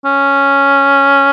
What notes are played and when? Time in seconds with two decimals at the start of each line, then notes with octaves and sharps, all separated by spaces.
0.05 C#4